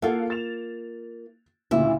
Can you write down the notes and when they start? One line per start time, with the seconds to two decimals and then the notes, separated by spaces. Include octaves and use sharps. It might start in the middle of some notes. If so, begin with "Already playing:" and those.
0.02 A#3 F4 A4 F5 F#5
0.30 A6 E7 F7
1.71 D2 A#2 C#3 E4